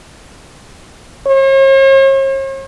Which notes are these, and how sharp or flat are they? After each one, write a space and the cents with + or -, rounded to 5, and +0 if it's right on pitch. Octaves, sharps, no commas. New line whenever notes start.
C#5 -45